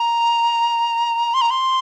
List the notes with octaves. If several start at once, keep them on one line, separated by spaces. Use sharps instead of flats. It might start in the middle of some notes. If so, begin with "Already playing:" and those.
Already playing: A#5
C6
A#5
C6